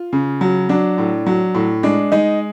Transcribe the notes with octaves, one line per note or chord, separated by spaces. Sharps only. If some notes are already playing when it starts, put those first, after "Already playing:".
Already playing: F4
C#3
F#3
F#3 D4
A2
F#3
A2
G#3 D4
G#3 D#4